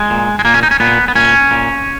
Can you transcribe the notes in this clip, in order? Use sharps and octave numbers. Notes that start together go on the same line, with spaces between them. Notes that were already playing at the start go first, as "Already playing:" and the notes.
Already playing: G#3
A#2
G#3
A#2 A#3
C#4
D#4
C#4
A#2 B3
B3
A#2 C#4
A#2